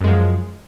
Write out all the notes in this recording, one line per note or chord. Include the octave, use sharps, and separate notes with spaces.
F#2 F3 G#3